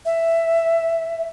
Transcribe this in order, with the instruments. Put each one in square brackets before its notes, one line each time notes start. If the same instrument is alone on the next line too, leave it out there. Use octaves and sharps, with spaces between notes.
[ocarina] E5